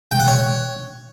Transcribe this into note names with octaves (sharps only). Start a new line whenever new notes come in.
G5
F#5
C#5